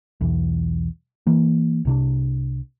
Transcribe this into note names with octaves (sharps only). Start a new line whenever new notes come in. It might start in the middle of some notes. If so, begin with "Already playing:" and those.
B1 E2
E3 A#3
C2 C3 D4